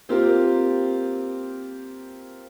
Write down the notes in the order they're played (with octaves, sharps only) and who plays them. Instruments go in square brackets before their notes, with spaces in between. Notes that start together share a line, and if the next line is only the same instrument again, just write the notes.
[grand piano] A#3 C4 F4 G4 A#4